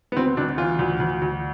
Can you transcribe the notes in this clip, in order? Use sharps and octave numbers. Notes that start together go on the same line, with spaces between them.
B3
D2 C4
D2 D4
E3 F4
D2
D2
D2